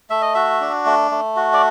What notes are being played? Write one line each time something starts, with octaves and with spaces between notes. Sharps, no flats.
A3 E5
D#5
F#4 E5
D4
A3
A3
F#4
D5